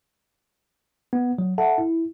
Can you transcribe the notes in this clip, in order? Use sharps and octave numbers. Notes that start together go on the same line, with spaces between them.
B3
F#3
A4 E5 F#5 A5
E4